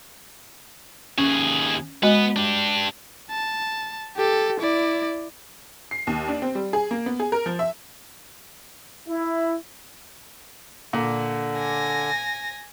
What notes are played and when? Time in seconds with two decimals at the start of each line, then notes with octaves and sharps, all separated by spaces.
1.18 D#2 C#4 G#4
2.03 G#3 B3 F#4 D#5
2.36 D4 G4
3.30 A5
4.17 G4 A4
4.60 E4 D5
5.91 C7
6.07 D#2
6.28 D4
6.42 C4
6.55 G3
6.73 G#4
6.91 A#3
7.06 B3
7.20 G#4
7.32 A#4
7.46 F3
7.59 E5
9.08 E4
10.93 A#2 D3
11.57 G#5 A#6